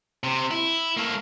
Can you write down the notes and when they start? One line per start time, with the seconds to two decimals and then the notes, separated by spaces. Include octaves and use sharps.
0.24 C3
0.51 E4
0.97 A3 A#3